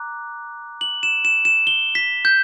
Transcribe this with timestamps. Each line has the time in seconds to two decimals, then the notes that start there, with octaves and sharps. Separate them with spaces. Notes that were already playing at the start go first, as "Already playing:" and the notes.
Already playing: A#5 D6 F#6
0.81 F#7
1.03 E7
1.25 E7
1.45 E7
1.67 G7
1.95 B6
2.25 G6